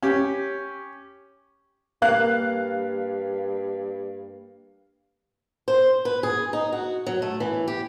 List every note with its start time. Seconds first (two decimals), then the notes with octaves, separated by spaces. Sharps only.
0.03 C#4 G4
2.02 G2 A#3 F5 F#6
5.68 C5
6.05 B4
6.23 G#4
6.53 D#4
6.72 F#4
7.06 F#3
7.22 A3
7.40 E3
7.68 G4